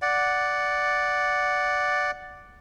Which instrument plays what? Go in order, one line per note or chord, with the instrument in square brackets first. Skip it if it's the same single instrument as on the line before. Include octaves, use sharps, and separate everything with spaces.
[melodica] D5 F#5